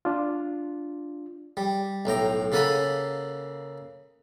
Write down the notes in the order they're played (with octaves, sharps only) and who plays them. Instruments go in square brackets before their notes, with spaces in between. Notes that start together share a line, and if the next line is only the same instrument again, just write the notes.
[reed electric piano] D4 F4
[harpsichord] G3
B1 A2 G5 A#5
C#3 A#3 A4 F#5 G#5 B5